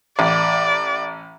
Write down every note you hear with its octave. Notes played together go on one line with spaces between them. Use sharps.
A1 D5